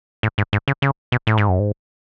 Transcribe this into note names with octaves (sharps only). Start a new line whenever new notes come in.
A2
G#2
G#2
C#3
C#3
B2
A2
G#2
F#2
G#2